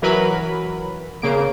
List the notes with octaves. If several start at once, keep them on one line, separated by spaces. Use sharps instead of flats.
E3 F#3 A#4 B4 B5
C#3 A#3 D7